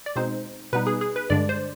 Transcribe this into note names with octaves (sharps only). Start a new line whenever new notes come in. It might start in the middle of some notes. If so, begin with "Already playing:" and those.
D5
B2 G#3 C4 D#4 C5
B2 G3 B3 D#4 B4
G#4
G#4
B4
G2 D3 G#3 D4 D5
C5